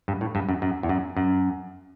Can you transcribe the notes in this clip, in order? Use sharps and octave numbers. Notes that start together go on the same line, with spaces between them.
G2
A2
G2
F#2
F#2
E2
F#2
F#2